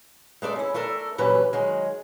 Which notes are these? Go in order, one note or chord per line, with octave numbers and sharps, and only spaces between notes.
G#3 A3 D4 D5
C#4 E4
A3 D4 A4 A#4
G2 A#2 E3 F#3 C#4 B4
D#3 F#3 G#3